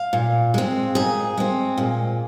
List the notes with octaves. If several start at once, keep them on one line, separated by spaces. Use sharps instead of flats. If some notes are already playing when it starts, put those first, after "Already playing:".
Already playing: F5
A#2
G#3 C4
A#2 G#4
G#3 C4
A#2